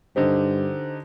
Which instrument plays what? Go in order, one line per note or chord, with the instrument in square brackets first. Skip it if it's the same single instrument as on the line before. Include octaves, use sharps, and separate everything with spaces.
[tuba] G2 [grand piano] D3 D#4 G4 [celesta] C5